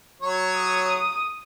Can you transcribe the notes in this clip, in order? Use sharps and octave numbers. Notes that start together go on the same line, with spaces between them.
F#3 C#5
D#6